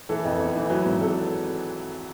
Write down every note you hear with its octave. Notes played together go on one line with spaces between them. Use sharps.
E3 A4
F2
G1
E3
F#3 B4
G#1
A4